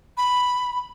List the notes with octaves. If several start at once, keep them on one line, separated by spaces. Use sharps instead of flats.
B5